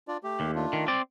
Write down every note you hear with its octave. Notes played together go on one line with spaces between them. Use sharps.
D4 F4 D5
A3 G4
D#2
A3 D4 F4
D#3
C4 D5